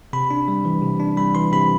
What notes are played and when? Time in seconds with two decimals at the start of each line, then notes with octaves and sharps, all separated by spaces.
0.13 C3 B5
0.31 D4
0.48 G3
0.65 E3
0.82 C3
1.00 D4
1.17 G3 B5
1.35 E3 C6
1.52 C3 B5